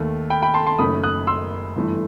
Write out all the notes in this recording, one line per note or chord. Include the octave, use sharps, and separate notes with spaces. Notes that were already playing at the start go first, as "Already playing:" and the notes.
Already playing: D#2 D#3 A3
G5 B5
G5 B5
A5 C6
A5 C6
F#1 F#2 D#3 A3 B5 D#6
D#6 F#6
C6 E6
G1 G2 E3 A3